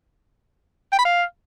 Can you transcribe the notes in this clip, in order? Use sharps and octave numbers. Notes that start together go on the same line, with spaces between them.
G5
B5
F5